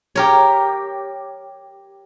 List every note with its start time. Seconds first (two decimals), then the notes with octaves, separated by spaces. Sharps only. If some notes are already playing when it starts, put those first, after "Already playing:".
0.15 G4 A#4 C#5